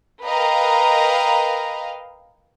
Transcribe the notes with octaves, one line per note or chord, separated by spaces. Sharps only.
A#4 B4 D#5 F5 G5 A#5